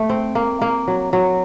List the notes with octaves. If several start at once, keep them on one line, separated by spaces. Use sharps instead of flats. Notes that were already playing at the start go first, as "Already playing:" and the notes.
Already playing: A3
C4
A#3
A#3
F#3
F#3